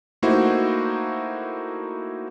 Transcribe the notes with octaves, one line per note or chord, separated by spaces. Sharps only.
A3 A#3 D#4 E4 F#4 C5